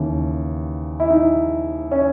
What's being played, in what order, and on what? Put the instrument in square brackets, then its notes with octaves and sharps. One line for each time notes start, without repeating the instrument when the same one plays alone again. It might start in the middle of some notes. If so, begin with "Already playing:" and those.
Already playing: [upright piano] D#2 C#3 E3
E4
D#4
C#4